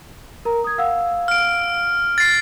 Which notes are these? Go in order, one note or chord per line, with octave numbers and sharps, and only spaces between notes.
A#4 A#5
D#6 G#6
F5 F#5 E6
F6 D7
A6 C7